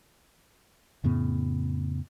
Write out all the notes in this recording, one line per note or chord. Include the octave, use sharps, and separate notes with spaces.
F2 A2 C#3 B3